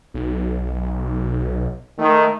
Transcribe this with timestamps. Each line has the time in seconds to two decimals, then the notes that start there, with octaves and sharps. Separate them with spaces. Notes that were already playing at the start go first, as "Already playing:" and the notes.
0.14 B1
1.98 D#3 A3